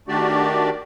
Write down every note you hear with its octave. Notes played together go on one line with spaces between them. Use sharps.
D#3 A3 D4 F#4 G4 D5